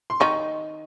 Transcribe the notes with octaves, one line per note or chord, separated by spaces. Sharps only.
C6
D#3 D#4 C#6